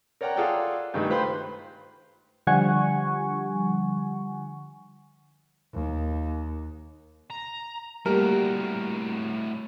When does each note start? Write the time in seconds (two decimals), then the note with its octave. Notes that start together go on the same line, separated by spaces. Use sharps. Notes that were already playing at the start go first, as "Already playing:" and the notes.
0.21 A#4 C#5 D5 F#5 G5 A#5
0.36 F4 G#4 A4 D5 F#5 G5
0.94 G2 D#3 G#3 A3
1.10 F4 B4 C5 G5 B5 C6
2.47 D3 F3 G3 F#5 G#5 C#6
5.74 D#2
7.30 A#5
8.06 A2 G3 A3 A#3 F#4 G4 A#4